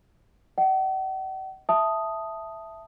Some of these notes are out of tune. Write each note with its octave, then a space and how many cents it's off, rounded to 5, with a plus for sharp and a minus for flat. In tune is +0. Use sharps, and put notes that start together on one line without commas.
D#5 +0 F#5 +45
E5 +0 A5 +0 D#6 +0